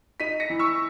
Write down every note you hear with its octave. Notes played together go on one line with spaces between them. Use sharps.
D#4 B6 D#7
A#6 C#7
E3
C#6 E6